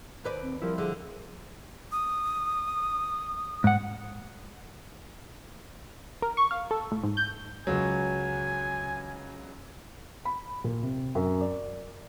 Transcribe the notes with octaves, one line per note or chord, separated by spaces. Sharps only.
D#2 B4 D5
C4
F3 G3 E4 A#4
D3 G#4
D#6
G#2 F#5
A#4
C#6
F5
A4
A2
G#2
G6
C#2 F#3 G#5
B5
A#2
C3
F#2
D5